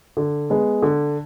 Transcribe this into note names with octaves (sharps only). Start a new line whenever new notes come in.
D3
G#3 B3
D3